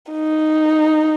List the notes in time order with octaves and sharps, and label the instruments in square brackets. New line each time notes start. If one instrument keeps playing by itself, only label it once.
[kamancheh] D#4